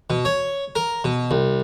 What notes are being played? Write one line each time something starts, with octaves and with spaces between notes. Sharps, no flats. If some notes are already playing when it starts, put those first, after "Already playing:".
B2
C#5
A#4
B2
C2